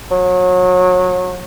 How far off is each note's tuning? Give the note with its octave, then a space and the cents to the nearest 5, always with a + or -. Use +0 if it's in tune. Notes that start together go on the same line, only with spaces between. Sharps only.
F#3 -30